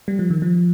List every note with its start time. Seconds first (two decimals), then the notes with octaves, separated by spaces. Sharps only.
0.08 G3
0.19 F3
0.30 D#3
0.42 F3